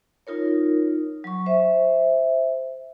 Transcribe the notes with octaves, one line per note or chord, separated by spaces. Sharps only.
D#4 F4 A#4 C#5
F#3 C#6
C5 E5